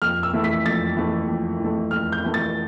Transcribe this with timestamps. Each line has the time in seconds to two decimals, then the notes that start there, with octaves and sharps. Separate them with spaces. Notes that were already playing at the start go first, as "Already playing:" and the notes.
0.02 F2 F6
0.23 E6
0.33 E3 A3
0.44 B6
0.65 F2 A6
0.97 E3 A3
1.28 F2
1.60 E3 A3
1.91 F2 F6
2.12 G6
2.23 E3 A3
2.34 A6